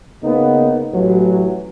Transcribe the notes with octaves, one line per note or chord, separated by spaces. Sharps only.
C#3 A#3 B3 D#4
A1 E3 F#3